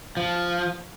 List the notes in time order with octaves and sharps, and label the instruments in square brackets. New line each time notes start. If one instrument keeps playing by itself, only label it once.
[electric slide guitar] F3